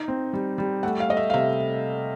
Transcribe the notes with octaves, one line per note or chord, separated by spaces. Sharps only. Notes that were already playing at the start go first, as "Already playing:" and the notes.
Already playing: D#4
C4
G3
G3
A3 F#5
F5
A3 D#5
E5
F5
C3 E5